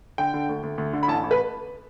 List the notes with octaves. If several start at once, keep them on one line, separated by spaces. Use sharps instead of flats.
D3 G5
D3
D2
D2
D2
D3
B5
A1 A5
A1
B4